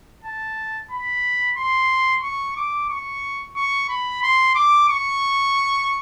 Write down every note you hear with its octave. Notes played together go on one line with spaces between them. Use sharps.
A5
B5
C6
C#6
D6
C#6
C#6
B5
C6
D6
C#6